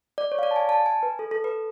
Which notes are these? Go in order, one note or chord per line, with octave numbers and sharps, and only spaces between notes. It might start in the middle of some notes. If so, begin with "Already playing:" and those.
D5
C#5
F5
D5
A5
G#5
A5
G#5
B4
A4
A4
B4